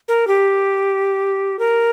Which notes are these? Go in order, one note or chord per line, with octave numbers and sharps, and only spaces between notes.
A#4
G4
A#4